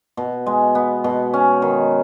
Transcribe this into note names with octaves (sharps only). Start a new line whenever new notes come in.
B2
G#3
B3
B2
C#4
D#3